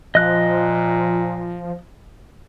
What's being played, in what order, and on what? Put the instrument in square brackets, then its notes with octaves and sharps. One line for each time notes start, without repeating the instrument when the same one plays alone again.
[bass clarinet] A#2 [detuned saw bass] F3 [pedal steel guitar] D#5 F#6